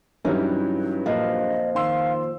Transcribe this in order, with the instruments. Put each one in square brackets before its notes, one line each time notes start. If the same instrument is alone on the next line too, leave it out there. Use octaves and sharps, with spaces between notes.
[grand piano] G2 F#3 G3 [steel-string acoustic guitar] E3 C#4 D#4
[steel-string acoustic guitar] F2 A#2 F3 [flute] D#5
[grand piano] D#3 C6 E6 [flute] F5